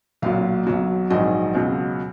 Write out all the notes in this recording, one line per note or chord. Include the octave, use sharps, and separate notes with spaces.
B1 A#2 F#3 F5
B1 B2 F#3
A#1 G#2 D#3 F#3 D#5
C#2 B2 F#3